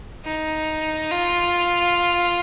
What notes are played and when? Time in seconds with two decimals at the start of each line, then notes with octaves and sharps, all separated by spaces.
0.25 D#4
1.11 F4